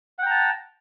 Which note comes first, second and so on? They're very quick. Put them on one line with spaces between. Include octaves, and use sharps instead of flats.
F#5 G5 A#5 A5